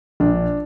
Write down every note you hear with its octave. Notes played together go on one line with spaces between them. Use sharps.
A#1 D4